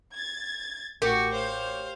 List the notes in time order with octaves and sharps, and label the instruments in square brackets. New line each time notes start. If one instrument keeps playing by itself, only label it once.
[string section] G#6 A6
[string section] A1 [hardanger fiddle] F#4 C#6 [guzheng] G4 [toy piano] A#4
[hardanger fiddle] C5 F5 [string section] C#5